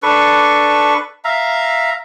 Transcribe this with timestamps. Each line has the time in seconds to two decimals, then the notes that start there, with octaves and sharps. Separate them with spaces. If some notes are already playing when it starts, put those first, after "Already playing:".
0.03 D4 A4 B4 C#6
1.25 E5 F5 A#5